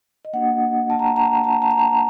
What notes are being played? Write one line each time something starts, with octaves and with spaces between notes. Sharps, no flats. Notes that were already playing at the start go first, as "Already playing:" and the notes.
D#5
A#3 D4 F#4 F#5
A5
A#5
A5
A#5
A5
A#5
A5
A#5
A5
A#5
A5